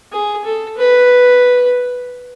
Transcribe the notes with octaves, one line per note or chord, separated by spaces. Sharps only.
G#4
A4
B4